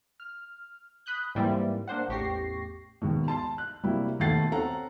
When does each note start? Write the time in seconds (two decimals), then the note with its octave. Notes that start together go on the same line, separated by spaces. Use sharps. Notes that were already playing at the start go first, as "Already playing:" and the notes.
0.20 F6
1.06 B5 D#6 F#6 G6
1.35 G#2 E3 G3 A#3 C4 E4
1.88 A#3 D4 C5 F#5
2.08 A1 E2 G4 C#6 A#6 C7
3.02 G#1 D#2 G#2 B2
3.28 A5 C6
3.58 F#6
3.83 C3 F#3 G3 A#3 E4
4.20 D#2 B2 A3 F#5 A6 C7
4.51 C4 C#4 A4 F#5 A#5